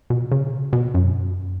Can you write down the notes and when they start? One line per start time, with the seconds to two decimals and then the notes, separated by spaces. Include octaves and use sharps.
0.10 B2
0.32 C#3
0.73 B2
0.94 F#2